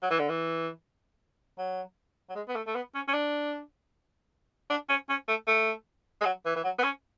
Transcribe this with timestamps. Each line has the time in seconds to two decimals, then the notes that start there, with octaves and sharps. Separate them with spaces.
0.02 F#3
0.11 E3
0.19 D3
0.29 E3
1.58 F#3
2.29 F#3
2.36 G#3
2.48 B3
2.56 A3
2.67 A3
2.75 B3
2.95 C#4
3.08 C#4
3.13 D4
4.70 D4
4.89 C#4
5.09 C#4
5.28 A3
5.48 A3
6.21 G#3
6.25 F#3
6.46 E3
6.56 E3
6.64 F#3
6.79 B3
6.84 C#4